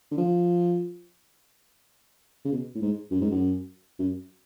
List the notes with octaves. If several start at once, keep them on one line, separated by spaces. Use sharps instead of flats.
D3
F3
C#3
B2
A2
G#2
F#2
G#2
F#2
F#2